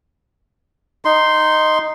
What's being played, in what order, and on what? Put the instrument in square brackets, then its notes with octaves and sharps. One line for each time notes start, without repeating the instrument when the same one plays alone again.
[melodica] D#4 C6